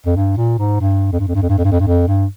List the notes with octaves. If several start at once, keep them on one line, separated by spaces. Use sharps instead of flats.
F2
G2
A#2
G#2
G2
F2
G2
F2
G2
F2
G2
F2
G2
F2
G2
F2
G2